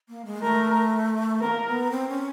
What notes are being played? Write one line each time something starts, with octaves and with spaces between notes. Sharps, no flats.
A#3
G#3
A3 A#4
A#3 B3 A#4
B3
C4
C#4